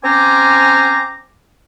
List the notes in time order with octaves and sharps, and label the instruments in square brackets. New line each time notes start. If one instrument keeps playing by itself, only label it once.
[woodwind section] C4 C#4 C5 G#5 A#5 D6